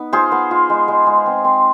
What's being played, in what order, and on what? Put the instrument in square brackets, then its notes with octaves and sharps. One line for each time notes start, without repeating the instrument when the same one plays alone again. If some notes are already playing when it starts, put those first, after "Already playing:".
Already playing: [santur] B3 D#4
F4 G#4 C5
B3
F4
G#3
G#3
G#3
C4
C4